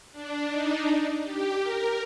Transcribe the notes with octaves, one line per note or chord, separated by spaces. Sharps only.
D4
D#4
G4
A#4